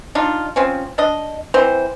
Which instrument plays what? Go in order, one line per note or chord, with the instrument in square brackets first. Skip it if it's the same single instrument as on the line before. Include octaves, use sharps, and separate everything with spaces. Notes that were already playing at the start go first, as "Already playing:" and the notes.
[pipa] D4 D#4 F4
F3 C4 C#4
D4 D#5
E3 C4 C5